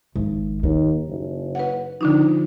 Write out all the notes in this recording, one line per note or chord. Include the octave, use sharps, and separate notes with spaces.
G#1
D#2 D#4
F#1
B4 F#5
D3 F3 D4 D#4